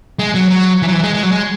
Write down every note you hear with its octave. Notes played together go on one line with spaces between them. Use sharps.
G#3
F#3
F#3
E3
F#3
E3
G#3
G#3
F#3
G#3